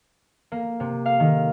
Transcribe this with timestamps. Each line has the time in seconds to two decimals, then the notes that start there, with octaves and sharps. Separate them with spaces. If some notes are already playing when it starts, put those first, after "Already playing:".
0.52 A#3
0.80 C3
1.06 F5
1.20 D#3